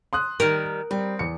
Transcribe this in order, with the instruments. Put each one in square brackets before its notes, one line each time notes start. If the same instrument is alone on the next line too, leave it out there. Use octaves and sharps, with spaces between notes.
[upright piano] C6 D#6 F#6
[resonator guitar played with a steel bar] D#3 G3 [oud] A#4
[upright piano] G3 [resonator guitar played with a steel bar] C4
[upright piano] E2 C#7